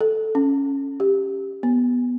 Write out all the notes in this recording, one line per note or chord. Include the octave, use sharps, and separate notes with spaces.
A4
C#4
G4
B3